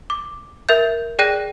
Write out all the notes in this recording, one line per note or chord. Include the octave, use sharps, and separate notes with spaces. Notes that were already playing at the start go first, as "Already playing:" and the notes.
D6
A#4 E5 G6
G#4 D5 G5 F#6 A#6 D#7